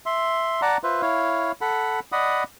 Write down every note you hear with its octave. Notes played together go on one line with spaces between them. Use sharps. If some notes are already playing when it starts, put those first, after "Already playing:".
E5 C6
D5 F#5 A5 A#5
F4 B4 C5 E5
E4 C#5 F5
A4 F#5 B5
D5 D#5 F#5 B5 D#6